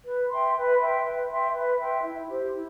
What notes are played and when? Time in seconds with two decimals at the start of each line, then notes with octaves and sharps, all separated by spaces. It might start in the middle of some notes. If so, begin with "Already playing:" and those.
0.05 B4
0.30 E5 G5 C6
0.55 B4
0.80 E5 G5 C6
1.04 B4
1.29 E5 G5 C6
1.54 B4
1.79 E5 G5 C6
2.04 E4
2.29 G4 C5
2.54 E4